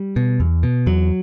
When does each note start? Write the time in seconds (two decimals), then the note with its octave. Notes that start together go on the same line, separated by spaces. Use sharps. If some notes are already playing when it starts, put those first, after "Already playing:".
Already playing: G3
0.16 B2
0.40 E2
0.63 B2
0.86 E2 F#3